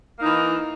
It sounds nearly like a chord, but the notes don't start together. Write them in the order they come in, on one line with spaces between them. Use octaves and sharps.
A#3 D#4 E3